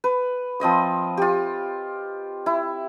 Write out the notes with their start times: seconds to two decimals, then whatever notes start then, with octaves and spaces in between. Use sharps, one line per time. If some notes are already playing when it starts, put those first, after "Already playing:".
0.04 B4
0.60 F3 C4 D#5 D#6
1.17 F4 G4
2.46 E4